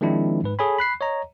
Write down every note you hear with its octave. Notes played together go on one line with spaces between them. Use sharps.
D#3 F3 G#3 C4 D4 E4
G#2 B4
G#4 A4 C#5 G#5 B5
B5 F#6 C7
C#5 D#5 A#5